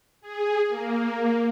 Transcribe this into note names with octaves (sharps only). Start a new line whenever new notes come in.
G#4
A#3